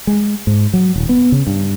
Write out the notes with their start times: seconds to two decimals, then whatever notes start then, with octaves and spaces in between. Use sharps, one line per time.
0.07 G#3
0.47 G#2
0.73 F#3
0.96 D#1
1.09 B3
1.32 C#3
1.47 G2